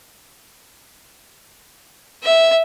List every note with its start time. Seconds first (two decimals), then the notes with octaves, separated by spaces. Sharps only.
2.23 E5